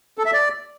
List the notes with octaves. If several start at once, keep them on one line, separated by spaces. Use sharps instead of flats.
A4
E5
D5